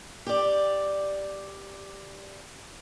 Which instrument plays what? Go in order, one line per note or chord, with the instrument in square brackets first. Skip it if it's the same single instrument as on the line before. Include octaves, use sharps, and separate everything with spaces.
[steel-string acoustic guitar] G4 D5